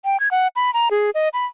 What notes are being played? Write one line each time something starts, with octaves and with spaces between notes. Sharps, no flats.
G5
G#6
F#5
B5
A#5
G#4
D#5
B5